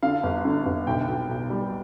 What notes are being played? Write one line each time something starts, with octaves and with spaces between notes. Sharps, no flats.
D3 F5
G1
D3
G1
B1 G5
B1
B1
G3